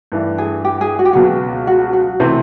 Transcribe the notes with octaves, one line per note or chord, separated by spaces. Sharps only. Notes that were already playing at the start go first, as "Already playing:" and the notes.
G2 E3 A3 D4
G#4
G4
G#4
F#4
G4
C#2 B2 F#3 F#4
F#4
F#4
C3 E3 A3 C4